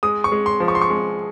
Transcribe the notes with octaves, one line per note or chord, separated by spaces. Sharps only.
G#3 D#6
C#6
G#3
C6
F3
C#6
C6
C#6
G#3